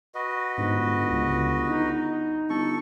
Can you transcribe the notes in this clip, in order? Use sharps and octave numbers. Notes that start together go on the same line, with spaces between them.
F#4 B4 D#5
G1 G#2
C#2
D#4
G1 A4 C#6